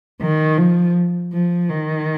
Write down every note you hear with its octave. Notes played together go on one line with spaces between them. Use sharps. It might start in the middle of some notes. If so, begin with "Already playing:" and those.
D#3
F3
F3
D#3